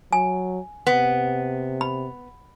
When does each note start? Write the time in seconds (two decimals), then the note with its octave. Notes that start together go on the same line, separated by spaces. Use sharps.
0.13 F#3 G#5
0.87 C3 B3
1.81 B5